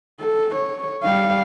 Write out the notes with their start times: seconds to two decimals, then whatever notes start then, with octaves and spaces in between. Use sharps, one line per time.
0.20 A4
0.55 C#5
1.03 G3 F5